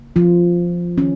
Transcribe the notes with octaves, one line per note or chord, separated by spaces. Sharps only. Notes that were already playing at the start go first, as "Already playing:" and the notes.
Already playing: C#3 A#3
F3 F4
D#3 C#4